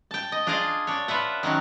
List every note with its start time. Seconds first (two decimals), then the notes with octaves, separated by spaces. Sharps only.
0.11 G5 A5
0.32 D#5
0.47 D4 F4 G#4 D5 D#5 F5
0.87 D4 C#5
1.08 F4 B4 E5 F#5
1.43 D#3 F#3 C#4 F#4